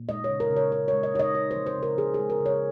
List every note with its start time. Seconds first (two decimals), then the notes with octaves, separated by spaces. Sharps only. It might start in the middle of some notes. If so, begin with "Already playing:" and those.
Already playing: A#2
0.09 G#3 D#5
0.24 C#5
0.29 C#3
0.40 A#4
0.51 C#3
0.57 C#5
0.72 C#3 C#5
0.88 G#3 C#5
1.03 D#5
1.14 D#4 C#5
1.19 D#5
1.35 D#4 C#5
1.51 C5
1.56 F3
1.66 C5
1.77 C#3
1.83 A#4
1.98 F3 G#4
2.14 G#4
2.20 G#3
2.30 A#4
2.41 C#3
2.46 C#5